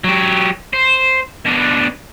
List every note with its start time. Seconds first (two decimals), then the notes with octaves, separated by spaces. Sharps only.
0.04 F#3 G4
0.73 C5
1.45 B2 D4